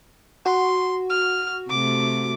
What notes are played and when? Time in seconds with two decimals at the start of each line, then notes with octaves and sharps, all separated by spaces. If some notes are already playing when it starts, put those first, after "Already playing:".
0.46 F#4 C6
1.10 F6
1.70 C3 A3 D6